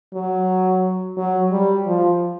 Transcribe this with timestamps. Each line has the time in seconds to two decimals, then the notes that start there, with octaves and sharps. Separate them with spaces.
0.14 F#3
1.17 F#3
1.51 G3
1.86 F3